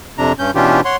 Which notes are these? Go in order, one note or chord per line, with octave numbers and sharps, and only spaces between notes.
F2 C3 D4 A#5
G2 C#4 G6
B2 E3 C#4 D4 F4 G4
C#5 F#5 C6